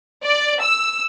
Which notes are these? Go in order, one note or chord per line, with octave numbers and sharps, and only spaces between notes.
D5
E6